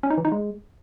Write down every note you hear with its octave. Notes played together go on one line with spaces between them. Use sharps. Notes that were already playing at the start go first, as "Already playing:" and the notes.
C#4
D#4
E3
D#4
G#3